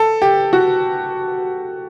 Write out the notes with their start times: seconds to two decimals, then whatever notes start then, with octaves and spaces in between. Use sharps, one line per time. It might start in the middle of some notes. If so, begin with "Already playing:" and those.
Already playing: A4
0.22 G4
0.53 F#4